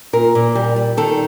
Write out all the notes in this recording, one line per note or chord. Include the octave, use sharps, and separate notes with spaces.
A#2 A#4
A#2
G3
G3
D#3 A4